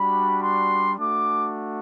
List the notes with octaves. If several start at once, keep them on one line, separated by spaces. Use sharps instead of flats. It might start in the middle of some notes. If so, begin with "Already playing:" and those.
Already playing: G3 D4 F#4 B5
C6
A3 D4 F#4 D6